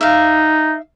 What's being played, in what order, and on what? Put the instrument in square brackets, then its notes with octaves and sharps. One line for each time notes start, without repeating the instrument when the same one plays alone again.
[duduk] D#4 [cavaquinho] E5 F5